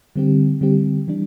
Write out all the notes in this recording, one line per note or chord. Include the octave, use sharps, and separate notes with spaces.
D3 G3 C4 G4
D3 G3 C4 G4
E3 G3 D4